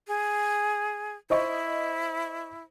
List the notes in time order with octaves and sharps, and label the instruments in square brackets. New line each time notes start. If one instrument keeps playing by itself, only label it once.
[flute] G#4
[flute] E4 [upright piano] C5 D#5 C#6